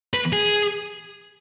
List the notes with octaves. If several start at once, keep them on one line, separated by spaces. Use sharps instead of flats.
B4
G#4